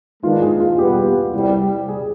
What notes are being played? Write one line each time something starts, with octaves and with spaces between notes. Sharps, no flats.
G#2 D#3 G#3 B3 D4 F4
G#4
F4
B2 G3 B3 G4
C2 C3 G3
G#4